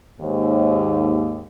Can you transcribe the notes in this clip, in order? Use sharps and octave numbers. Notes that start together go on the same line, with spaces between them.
D#2 G#2